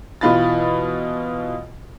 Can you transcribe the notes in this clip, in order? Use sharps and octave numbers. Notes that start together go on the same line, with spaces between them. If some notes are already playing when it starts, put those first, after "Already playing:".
B2 E3 F4 B5 A6